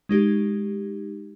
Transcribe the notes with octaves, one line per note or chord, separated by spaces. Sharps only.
G#3 D#4 G4